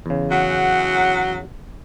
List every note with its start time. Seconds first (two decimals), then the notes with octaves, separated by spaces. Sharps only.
0.06 E2 C#3
0.30 F#3 F#5